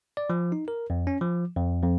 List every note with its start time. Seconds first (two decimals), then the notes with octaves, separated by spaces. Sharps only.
0.17 D5
0.30 F3
0.52 D#4
0.68 A#4
0.90 F2
1.07 C#4
1.21 F3
1.57 F2
1.82 F2